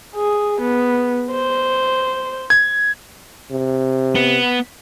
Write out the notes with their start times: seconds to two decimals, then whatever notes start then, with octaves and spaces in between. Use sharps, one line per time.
0.15 G#4
0.61 B3
1.31 C5
2.50 G#6
3.51 C3
4.15 B3